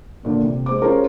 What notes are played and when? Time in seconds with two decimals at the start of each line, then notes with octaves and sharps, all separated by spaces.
0.23 G2 A#2 D3
0.44 C3
0.66 G#3 C5 D6
0.81 C#4 F4 G4 G#4 A#4 C5